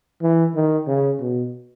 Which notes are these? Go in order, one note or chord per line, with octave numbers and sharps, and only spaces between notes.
E3
D#3
C#3
B2